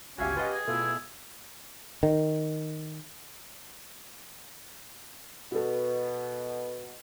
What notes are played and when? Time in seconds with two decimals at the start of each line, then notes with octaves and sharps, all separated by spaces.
0.18 G1 C#2 C#4 F#4 G4 E5 F5 G#5
0.36 F4 G4 B4 D#5 F5 F#5
0.52 G#4
0.68 B2 A3 E4 F4
2.03 D#3
5.52 B2 F#4 A4